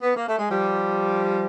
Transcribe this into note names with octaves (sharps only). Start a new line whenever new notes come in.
B3
A#3
A3
G#3
F3 G3